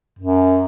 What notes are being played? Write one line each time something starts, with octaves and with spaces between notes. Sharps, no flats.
F#2